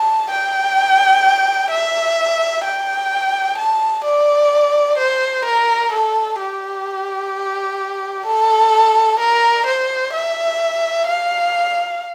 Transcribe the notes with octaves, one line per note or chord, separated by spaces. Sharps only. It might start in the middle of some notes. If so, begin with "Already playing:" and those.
Already playing: A5
G5
E5
G5
A5
D5
C5
A#4
A4
G4
A4
A#4
C5
E5
F5